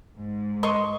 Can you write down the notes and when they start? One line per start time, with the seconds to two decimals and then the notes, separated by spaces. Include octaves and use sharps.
0.17 G#2
0.63 D#5 C6 C#6